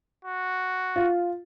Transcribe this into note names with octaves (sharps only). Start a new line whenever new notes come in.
F#4
F4